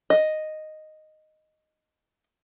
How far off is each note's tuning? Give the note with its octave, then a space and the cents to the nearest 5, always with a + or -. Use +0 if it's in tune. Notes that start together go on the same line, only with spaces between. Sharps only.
D#5 -5